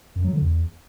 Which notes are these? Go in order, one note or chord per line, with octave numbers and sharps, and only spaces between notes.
F#2
F#3
D3
E2